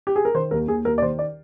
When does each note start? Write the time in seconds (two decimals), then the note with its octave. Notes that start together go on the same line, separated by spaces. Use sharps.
0.07 G4
0.16 G#4
0.25 A#4
0.34 D#3 C5
0.51 D#2 A#4
0.68 D#2 G#4
0.85 D#2 A#4
0.98 D5
1.02 D#3 C5
1.19 D5